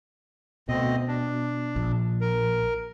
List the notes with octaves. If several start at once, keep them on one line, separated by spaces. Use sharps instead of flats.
D2 B2 C4 D#5
D4
A#1
A#4